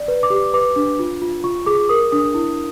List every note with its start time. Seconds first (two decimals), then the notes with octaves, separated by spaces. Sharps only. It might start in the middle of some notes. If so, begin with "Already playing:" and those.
Already playing: D5
0.08 B4
0.23 D6
0.30 G4
0.54 B4 D6
0.76 D4
0.99 F4
1.22 F4
1.44 F4 C#6
1.66 G#4 D6
1.89 A#4 D#6
2.12 D4 D#6
2.35 E4